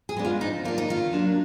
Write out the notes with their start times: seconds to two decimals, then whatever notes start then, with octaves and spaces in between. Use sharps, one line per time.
0.09 G#4
0.16 G#3 B3 D4
0.25 F4
0.41 F3 D#4
0.65 A#3 D4 F4
0.78 D#4
0.89 D#3 F4
1.13 F#3 A#3 D4